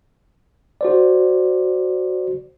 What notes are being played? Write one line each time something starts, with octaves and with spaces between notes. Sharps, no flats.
F#4 C5 D5